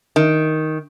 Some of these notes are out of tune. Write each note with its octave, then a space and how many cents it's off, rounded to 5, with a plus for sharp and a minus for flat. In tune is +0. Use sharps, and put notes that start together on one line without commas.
D#3 +5